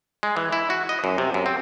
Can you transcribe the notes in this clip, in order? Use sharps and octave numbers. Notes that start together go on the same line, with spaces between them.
G#3
E3
E4
F#4
D#5
F#2
C3
F#2
C4